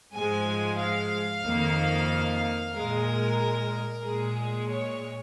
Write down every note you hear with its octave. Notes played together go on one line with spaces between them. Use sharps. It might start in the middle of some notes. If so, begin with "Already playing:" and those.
G#2 F3 G#3 G#5
F5
F2 D#3 A#3
A#2 G#3 A#4
A#2 G#3 G#4
C#5